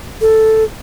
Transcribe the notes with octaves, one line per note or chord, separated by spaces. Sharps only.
A4